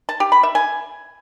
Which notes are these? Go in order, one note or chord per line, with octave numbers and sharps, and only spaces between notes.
A5
G4
B5
E5
G#5